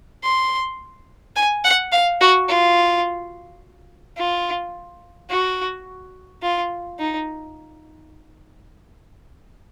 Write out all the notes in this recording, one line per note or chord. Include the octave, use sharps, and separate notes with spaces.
C6
G#5
F#5
F5
F#4
F4
F4
F#4
F4
D#4